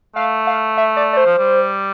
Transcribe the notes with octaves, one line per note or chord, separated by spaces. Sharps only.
A3 F5
F5
E5
D5
D5
C5
F3
G3